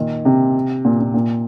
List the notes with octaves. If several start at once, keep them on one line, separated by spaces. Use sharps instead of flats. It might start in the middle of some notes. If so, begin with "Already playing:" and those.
Already playing: A#2 D#3
C3
A#2
A#2
A#2